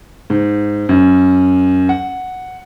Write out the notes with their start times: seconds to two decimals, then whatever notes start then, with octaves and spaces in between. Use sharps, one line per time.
0.30 G#2
0.89 F#2
1.89 F#5